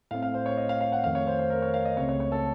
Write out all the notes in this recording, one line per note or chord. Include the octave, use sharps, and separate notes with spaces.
A2 A3 C4 F5
F5
C5
C#5
D#5
F5
F5
F#5
F2 D#3 A3 F5
C#5
C5
C5
A#4
C#5
F5
D#5
C#2 C#3 A3 C4 C#5
C#5
C#5
A4